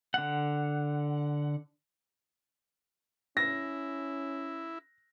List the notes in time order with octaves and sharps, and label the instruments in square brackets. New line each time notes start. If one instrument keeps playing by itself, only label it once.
[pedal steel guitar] D3 F#5
[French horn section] C#4 [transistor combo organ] E4 [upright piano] A#6